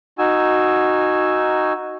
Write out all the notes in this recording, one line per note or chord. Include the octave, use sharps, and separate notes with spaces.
D#4 F#4 G#5 E6